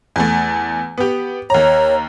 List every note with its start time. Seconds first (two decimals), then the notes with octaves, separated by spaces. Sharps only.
0.16 E2 A3
0.98 B3 G4
1.50 D#2 C#5 A#5